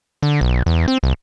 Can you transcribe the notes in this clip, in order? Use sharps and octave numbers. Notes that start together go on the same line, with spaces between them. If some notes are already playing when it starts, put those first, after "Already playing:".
D3
B1
E2
C4
C2